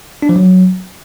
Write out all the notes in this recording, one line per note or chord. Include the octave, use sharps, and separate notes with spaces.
D4
F3
F#3